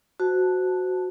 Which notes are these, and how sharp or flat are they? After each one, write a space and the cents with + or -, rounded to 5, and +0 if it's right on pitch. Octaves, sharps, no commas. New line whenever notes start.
F#4 +0 C5 -25 A5 +0